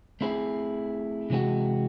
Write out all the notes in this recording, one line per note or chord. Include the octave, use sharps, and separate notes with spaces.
A3 C4 E4 G#4 C5
C3 E3 G#3 C4 F#4